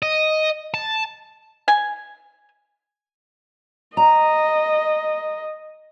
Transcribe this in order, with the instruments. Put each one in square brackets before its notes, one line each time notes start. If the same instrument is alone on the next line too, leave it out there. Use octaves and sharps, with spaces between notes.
[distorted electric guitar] D#5
A5
[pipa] G#5
[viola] D#5 [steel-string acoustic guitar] A#5